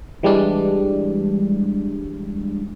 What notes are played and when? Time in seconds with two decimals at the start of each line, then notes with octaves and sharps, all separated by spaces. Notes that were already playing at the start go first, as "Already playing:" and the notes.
0.23 E3 G3 G#3 D4